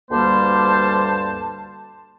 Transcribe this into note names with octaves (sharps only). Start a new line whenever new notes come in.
D2 G2 G3 A#3 C5 A5